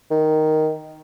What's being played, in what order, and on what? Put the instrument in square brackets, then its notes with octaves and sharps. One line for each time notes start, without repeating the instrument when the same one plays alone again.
[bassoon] D#3